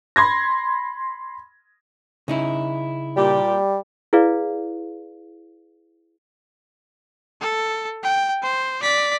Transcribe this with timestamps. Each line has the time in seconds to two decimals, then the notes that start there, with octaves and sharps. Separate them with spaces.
0.16 B5 C6 G#6 A#6
2.28 C#3 D#4 E4
3.16 A#2 G3 G4
4.13 E4 G#4 B4 D5 F5
7.41 A4
8.03 G5
8.42 C5
8.82 D5 B6